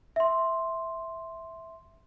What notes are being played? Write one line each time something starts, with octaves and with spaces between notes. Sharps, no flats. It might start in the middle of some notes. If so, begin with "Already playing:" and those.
E5 C6